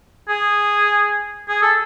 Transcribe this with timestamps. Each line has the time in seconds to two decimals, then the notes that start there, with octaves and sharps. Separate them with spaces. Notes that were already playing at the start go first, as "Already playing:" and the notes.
0.29 G#4
1.48 G#4
1.62 A4